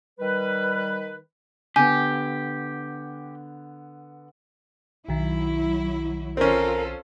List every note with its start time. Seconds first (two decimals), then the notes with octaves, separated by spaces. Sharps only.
0.20 D#3 G3 B4
1.76 D3 B3 G4 G#5
5.08 B1 D#3 F#3 E4
6.37 C4 C#4 F4 A4 A#4